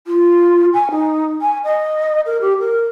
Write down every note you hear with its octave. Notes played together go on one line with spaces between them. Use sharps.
F4
G#5
D#4
G#5
D#5
A#4
G4
A#4